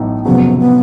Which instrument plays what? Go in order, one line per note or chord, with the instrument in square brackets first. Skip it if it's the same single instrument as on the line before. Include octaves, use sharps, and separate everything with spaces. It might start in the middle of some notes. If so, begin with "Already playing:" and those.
Already playing: [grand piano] A1 A2 F#3 B3 D#4
[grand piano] F1 F2 C#3 F#3 [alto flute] B3
[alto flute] B3